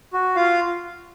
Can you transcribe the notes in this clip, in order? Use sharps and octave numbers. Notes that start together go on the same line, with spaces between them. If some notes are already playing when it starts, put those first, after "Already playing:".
F#4
F4 F5